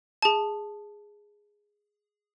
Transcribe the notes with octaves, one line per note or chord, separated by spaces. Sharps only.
G#4 A5